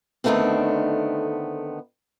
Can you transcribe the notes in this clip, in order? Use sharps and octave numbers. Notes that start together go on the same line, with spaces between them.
D3 D#3 F#3 A3 B3 C4